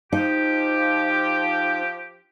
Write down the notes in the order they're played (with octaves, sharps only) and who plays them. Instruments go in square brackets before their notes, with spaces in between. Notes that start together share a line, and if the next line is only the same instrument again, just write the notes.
[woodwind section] F3 G4 [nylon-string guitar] D#4